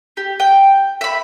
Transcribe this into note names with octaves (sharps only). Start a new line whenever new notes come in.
G4
G5
E5 B5